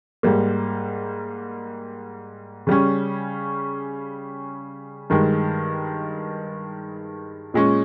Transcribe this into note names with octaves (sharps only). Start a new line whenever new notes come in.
G#2 G3 A#3
C#3 G3 C#4
G2 D#3 G#3
A#2 G#3 C#4